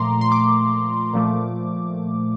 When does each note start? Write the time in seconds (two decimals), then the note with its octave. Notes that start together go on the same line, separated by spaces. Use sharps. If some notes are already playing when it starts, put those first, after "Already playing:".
Already playing: A#2 F3 A3 A#5 C6 D6
0.21 C6
0.32 D6
1.14 A#2 F3 A3